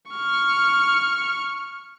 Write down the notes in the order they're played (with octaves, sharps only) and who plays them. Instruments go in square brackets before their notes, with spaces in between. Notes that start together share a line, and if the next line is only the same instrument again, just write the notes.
[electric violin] C#6 F6